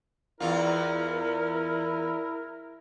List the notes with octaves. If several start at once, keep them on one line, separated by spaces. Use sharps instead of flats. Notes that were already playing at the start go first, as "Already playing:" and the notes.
E2 E4 F4 A#4